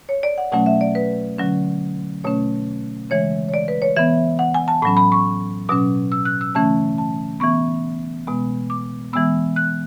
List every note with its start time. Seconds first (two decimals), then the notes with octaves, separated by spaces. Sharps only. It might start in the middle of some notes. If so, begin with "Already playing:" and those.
0.09 C#5
0.23 D5
0.38 F#5
0.52 B2 F#3 A3 C#4 F#5
0.66 E5
0.81 D5
0.95 B4
1.38 D3 F#3 C#4
2.24 B2 A3 C#4 C#5
3.10 C#3 E3 G#3 C#5
3.49 C#5
3.54 D5
3.68 B4
3.82 C#5
3.96 E3 B3 E5
4.39 F#5
4.54 G#5
4.68 A5
4.82 A2 F#3 C#4 B5
4.97 B5
5.12 C#6
5.69 B2 F#3 C#4 D6
6.12 E6
6.25 F#6
6.41 E6
6.55 C#3 E3 A3 C#4 A5
6.98 A5
7.40 E3 B3 C#6
8.27 B2 G#3 B3
8.70 D6
9.13 E3 G#3 B3 E6
9.56 F#6